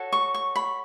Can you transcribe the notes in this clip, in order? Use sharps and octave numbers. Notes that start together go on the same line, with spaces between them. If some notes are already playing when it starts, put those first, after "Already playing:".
Already playing: F#4 A4 C#5
C#6
C#6
B5